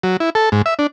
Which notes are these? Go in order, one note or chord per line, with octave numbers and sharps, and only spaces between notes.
F#3
E4
A4
G#2
E5
D4